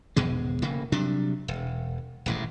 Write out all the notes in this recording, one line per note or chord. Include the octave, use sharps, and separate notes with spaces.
G#1 E2 B2 G#3
D1 C#3 A#3
C3 F#3 G3 D4
E1
D#1 A1 G#2